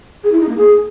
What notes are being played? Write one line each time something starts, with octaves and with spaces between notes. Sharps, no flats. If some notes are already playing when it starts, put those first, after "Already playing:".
G#4
E4
D#4
A#3
G#4